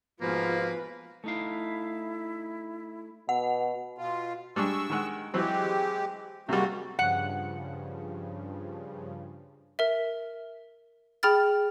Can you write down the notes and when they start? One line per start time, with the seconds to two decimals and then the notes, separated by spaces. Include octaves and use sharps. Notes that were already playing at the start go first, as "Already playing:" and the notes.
0.21 G#2 B2 F3 A#3 F4 B4
1.24 A3 D#4 E4 F5
3.29 B2 F#5
3.98 B2 F4
4.56 G3 G#3 D4 C#6 E6
4.90 D#3 G#3 F#5
5.34 E3 F#3 G#3 C4 G4
6.49 C3 G3 G#3 A#3 F#4
6.99 G2 C#3 F3 F#5
9.79 A#4 E5
11.23 G#4 G5 B5 F6 A6